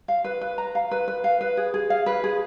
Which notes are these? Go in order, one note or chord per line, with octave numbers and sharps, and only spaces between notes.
F5
B4
B4
A#5
F5
B4
B4
F5
B4
G#4
G#4
F5
B4
G#4